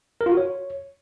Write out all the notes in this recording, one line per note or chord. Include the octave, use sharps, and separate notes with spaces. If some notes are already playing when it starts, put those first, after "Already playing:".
A#4
F4
F#4
C#5